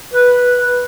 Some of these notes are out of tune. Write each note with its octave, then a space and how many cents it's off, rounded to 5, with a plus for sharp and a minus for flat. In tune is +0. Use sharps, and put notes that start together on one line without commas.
B4 -5